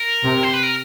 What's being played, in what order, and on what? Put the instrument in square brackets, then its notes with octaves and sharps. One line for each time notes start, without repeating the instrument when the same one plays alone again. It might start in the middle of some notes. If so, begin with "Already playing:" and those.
Already playing: [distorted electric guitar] A#4
[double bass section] C3
[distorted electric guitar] C5
B4
A#4